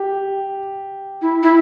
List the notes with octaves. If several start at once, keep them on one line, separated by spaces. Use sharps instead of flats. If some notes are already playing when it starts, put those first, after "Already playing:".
Already playing: G4
E4
E4